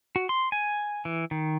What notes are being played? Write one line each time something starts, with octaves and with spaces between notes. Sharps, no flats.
F#4
C6
G#5
E3
D#3